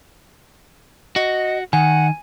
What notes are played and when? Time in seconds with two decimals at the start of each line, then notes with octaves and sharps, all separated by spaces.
1.16 F#4 D#5
1.73 D#3 F#5 G#5